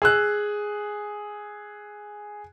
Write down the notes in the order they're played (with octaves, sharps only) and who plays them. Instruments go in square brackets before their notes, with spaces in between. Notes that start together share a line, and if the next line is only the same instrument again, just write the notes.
[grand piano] G#4 E6 F#6